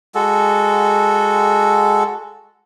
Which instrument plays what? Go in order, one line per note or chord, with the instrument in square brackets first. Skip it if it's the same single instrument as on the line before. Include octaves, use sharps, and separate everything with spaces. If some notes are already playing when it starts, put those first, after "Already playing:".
[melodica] G#3 F#4 A4